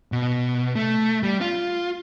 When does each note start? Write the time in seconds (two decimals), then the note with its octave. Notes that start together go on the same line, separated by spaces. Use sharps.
0.12 B2
0.76 A3
1.23 G3
1.41 F4